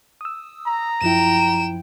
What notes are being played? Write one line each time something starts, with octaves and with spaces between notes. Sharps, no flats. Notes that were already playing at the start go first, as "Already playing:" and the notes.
D#6 E6
A#5
F#2 F3 E4 G5 E7